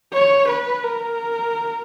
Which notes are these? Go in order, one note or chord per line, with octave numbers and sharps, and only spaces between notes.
C#5
B4
A#4